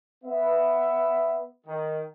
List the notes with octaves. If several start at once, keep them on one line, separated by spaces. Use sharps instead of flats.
B3 E5
D#3